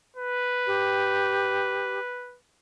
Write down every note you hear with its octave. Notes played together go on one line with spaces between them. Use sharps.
B4
G4